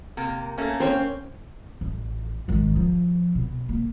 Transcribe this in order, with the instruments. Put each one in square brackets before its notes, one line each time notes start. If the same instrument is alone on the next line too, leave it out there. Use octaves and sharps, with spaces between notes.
[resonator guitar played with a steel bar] C3 A#3
A3 A#3 C#4
[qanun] A#3 C#4 C5 [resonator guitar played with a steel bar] C4
[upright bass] A1
G#1 D#3
F3
B2
A#3